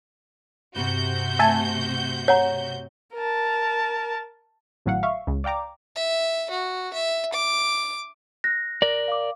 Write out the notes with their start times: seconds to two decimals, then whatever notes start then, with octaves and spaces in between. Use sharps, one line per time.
0.76 G2 C3 F#4 G6
1.39 A3 E5 G#5 A5
2.28 C#5 F#5 A#5
3.14 A#4 A5
4.86 G#1 A2 F#3 F5 F#5
5.03 E5 F5 C#6
5.27 C#2
5.44 D5 F5 G5 A#5 D6
5.96 E5
6.50 F#4
6.93 E5
7.33 D6
8.44 F#6 A#6
8.82 A#4 D5
9.08 F5 D6